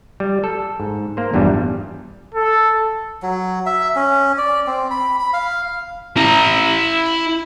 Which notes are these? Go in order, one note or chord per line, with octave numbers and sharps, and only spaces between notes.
G3
A4
G#2
A#3 C5
A1 E2 G2 A#2 G3
A4
F#3
E5
C#4
D5
C4
B5
B5
F5
E4 A#5